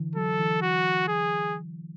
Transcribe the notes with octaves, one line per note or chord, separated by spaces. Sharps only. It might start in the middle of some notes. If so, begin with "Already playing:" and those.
Already playing: D3 E3
F#3 A4
E3
F#4
G#4